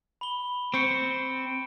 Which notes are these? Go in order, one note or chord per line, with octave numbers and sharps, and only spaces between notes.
B5 G7
C4 C#6 G6 C#7